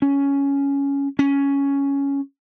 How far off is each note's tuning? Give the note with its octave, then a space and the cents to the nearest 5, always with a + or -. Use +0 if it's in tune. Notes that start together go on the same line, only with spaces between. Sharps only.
C#4 +10
C#4 +5